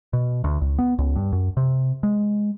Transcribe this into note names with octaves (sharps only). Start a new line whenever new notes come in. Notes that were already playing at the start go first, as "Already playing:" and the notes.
B2
D2
C#2
B3
C#2
G2
F#2
C3
G#3